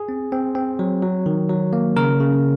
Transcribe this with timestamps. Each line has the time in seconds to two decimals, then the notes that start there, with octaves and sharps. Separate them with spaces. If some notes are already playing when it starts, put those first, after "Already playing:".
Already playing: G#4
0.09 C4
0.32 C4
0.55 C4
0.79 F#3
1.02 F#3
1.26 D#3
1.49 F#3
1.73 A#3
1.96 C#3 A#4
2.20 C#3